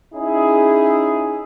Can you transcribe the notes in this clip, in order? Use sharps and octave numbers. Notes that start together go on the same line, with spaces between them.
C#4 D#4 E4 G#4